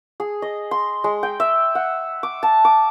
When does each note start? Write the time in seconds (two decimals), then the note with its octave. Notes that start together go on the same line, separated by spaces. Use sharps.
0.20 G#4
0.42 D#5
0.71 C6
1.04 G#3
1.23 G5
1.40 E5
1.75 F#5
2.23 D6
2.43 A5
2.65 D6